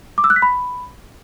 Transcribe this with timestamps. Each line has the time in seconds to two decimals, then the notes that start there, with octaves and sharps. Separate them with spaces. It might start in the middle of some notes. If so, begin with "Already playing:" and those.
0.18 D6
0.24 E6
0.30 F#6
0.36 B6
0.42 B5